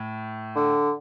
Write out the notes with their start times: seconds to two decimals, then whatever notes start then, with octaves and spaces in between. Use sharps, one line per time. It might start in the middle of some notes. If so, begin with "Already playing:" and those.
Already playing: A2
0.56 D3